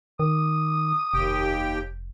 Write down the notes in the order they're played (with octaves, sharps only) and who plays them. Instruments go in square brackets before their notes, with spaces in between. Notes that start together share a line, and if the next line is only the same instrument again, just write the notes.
[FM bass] D#3 [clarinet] D#6
[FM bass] F1 [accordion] D#2 G4 G5